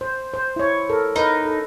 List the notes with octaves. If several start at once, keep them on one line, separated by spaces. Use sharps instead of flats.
C5
C5
E4 C#5
A4 A#4
D#4 A#4 B4
A4